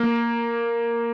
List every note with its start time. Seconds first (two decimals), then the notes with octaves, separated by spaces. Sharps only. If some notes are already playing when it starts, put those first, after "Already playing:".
Already playing: A#3